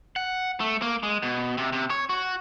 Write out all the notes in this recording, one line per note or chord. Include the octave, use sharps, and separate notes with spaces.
F#5
A3
A#3
G#3
B2
C3
C3
C#5
F#4